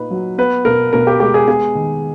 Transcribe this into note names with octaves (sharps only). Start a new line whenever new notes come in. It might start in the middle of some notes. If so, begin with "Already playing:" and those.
Already playing: A#2 A#3 D#4 B4
F#3
B3 B4
B2 A#4
B2 A#4
G4
G#3 G4
G#4
B3 G#4
D#3